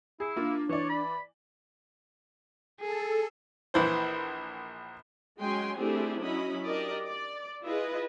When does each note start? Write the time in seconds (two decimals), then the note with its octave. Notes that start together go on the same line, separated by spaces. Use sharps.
0.20 E4 G#4
0.36 A#3 D4 F4
0.69 E3 C#5 D5
0.89 B5
2.80 G#4 A4
3.74 A#1 E3 C5
5.39 F#3 G#3 C#4 G5 G#5 C6
5.78 A3 C4 D4 E4 G4 G#4
6.21 F#3 C#4 E4 D#5 B5
6.66 D4 G4 A#4 D5 D#5
7.06 D5
7.64 E4 F4 G#4 B4 D#5